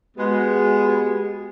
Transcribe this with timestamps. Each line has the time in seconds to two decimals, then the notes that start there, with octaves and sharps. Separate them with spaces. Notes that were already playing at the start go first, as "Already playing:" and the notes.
0.17 G#3 B3 F#4 G4